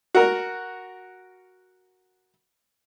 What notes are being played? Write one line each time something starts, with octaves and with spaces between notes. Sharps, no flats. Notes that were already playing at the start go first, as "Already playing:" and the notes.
F#4 A#4